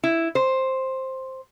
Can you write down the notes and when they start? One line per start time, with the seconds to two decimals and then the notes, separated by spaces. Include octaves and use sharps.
0.04 E4
0.35 C5